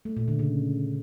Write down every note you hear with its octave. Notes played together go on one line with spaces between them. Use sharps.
A3
A#2
D3
C#3